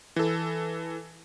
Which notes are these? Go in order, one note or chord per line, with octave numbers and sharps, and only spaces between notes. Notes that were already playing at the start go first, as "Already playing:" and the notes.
E3 A4